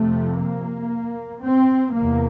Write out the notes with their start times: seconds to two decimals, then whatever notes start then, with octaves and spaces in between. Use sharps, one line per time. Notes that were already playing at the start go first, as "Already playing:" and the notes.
Already playing: F2 C3 A3
0.39 A#3
1.42 C4
1.94 E2 C3 A#3